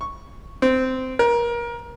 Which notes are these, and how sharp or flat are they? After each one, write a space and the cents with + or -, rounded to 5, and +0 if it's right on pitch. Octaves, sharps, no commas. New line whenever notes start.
C#6 +0
C4 -15
A#4 +25